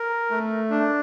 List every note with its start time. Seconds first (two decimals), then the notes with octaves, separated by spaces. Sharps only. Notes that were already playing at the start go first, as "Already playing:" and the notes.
Already playing: A#4
0.31 A3
0.70 D4